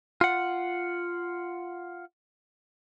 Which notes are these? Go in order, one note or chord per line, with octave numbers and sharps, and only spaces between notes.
F4 F#5